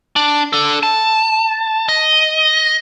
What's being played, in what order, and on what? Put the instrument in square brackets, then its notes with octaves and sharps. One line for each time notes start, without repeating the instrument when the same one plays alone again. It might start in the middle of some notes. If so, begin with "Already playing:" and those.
[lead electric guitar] D4
D4 A4
A5
D#5